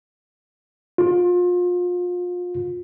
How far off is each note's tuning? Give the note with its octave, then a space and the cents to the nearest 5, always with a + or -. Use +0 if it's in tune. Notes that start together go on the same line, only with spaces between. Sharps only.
F4 +30